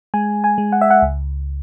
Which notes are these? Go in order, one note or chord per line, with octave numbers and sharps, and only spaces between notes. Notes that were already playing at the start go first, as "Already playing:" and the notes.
G#3 G#5
G#5
G#3
F#5
E5
F#5
C#2